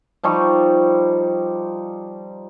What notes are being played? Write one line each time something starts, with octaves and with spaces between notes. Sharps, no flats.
F3 G3 D#4 C#6